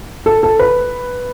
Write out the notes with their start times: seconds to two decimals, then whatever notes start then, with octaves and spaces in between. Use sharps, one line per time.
0.26 A4
0.43 A4
0.59 B4